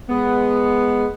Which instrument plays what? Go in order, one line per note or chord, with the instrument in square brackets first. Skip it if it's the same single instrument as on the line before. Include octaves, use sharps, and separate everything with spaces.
[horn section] G#3 B3